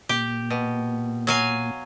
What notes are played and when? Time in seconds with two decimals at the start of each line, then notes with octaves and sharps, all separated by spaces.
0.09 A#2 G4
0.50 B2
1.27 F#3 F5 G#5